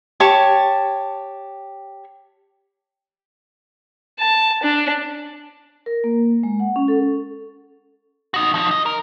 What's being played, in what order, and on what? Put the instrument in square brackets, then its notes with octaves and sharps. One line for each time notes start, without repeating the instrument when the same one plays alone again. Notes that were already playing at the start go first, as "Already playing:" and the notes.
[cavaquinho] G4 C#5 A5 C#6
[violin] A5
D4
[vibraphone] A#4
A#3
G#3
F#5
C#4
A4
[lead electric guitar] D#4 F#4
F3 D#4
D#5
A#4